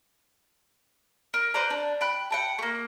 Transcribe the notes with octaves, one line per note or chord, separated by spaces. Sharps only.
A#4
B4 C5 D5 A#5
D4
G5 B5 F#6
F#5 G5 A5
A3 A#3